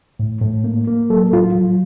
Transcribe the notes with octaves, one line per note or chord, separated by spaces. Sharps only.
A2
A2
A#3
A#3
F#3 A4
A2 F4
F#3